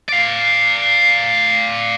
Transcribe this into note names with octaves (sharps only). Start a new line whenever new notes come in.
D5 F5